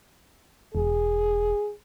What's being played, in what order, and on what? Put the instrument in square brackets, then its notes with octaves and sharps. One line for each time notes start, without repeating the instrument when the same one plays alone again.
[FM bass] E1 [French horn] G#4